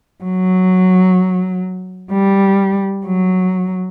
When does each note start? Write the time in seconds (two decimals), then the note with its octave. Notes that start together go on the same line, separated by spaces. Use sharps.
0.24 F#3
2.12 G3
3.07 F#3